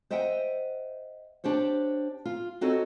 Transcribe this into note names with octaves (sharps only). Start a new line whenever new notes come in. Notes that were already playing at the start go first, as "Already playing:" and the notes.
C5 D#5 E5 F#5 G5
D4 G4 C5 C#5
F4
C4 D#4 F#4 A4 C#5